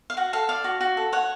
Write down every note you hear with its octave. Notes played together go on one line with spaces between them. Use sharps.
F5
F#4 F#5
A4 F5
D5 F5
F#4
F#4
A4
C#5 F#5